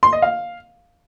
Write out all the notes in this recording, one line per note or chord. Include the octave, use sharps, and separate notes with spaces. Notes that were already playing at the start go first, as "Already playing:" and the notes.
C6
D#5
F5